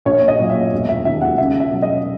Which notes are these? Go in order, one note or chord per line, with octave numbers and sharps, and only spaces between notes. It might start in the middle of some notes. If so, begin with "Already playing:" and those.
A#1 C#5
D#5
A#2 F#3
E5
E1
E5
D#2 D#3 E5
F#5
C#2 E5
E5
B2 F#3
D#5